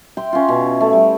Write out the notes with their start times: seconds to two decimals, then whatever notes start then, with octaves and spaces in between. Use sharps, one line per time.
0.17 E5 G5 C6
0.33 C#4 F4
0.48 B2
0.64 E4
0.81 A3
0.93 G3